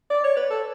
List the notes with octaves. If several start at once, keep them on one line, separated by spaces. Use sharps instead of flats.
D5
C#5
B4
A4